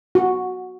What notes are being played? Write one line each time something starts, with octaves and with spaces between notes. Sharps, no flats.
F#4